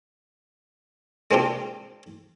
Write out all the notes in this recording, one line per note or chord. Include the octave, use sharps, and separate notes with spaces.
G#3 A#3 C4 D4 F4 G4